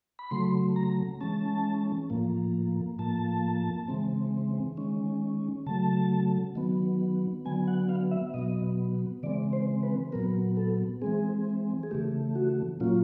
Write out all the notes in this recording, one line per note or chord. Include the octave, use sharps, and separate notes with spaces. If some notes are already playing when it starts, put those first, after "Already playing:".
B5
C#3 F#3 A3 C6
A#5
E3 G#3 C#4 A5
A2 F3 A#3
A2 F3 A#3 A5
C#3 E3 G#3 C4
D#3 G#3 C#4
C#3 F#3 A3 A5
D#3 F#3 B3
D3 F#3 B3 G#5
F#5
F5
E5
B2 F#3 B3 D#5
C#3 E3 G#3 C4 D5
C5
B4
A#2 F#3 B3 A#4
A4
E3 G#3 C4 G#4
G#4
C#3 E3 A3 G4
F#4
A#2 F#3 A#3 C#4 F4